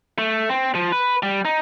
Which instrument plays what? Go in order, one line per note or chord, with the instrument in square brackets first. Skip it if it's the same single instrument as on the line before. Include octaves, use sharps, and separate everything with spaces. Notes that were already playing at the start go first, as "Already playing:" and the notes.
[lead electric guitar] A3
C4
F3
B4
G3
D#4